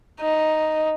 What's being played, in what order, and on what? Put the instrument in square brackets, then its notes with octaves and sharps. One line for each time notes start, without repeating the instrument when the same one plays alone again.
[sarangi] D#4